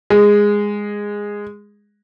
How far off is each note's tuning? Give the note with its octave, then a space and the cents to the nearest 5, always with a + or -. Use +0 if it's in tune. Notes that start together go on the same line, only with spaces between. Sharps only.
G#3 -10